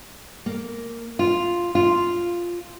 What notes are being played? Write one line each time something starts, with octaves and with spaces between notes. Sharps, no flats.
A#3
F4
F4